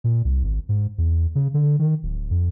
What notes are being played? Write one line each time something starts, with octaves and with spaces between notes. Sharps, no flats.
A#2
C2
G#1
G#2
E2
C#3
D3
D#3
D1
F2